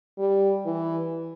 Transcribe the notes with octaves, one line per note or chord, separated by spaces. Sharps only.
G3
E3